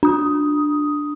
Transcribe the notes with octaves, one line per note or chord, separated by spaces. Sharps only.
D4 D#6